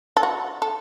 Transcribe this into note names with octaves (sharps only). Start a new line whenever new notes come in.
A4
F#4
A4